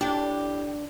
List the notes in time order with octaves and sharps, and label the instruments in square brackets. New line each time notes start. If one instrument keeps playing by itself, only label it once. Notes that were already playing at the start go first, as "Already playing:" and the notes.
[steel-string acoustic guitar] A2 G4 [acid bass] D4